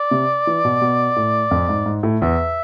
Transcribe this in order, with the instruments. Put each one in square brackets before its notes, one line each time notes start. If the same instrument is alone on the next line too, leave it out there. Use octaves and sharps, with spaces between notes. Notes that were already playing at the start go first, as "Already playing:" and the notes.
Already playing: [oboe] D5
[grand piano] C3
E3
B2
B2
A2
F2
G#2
G#2
A2
[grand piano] E2 [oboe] E5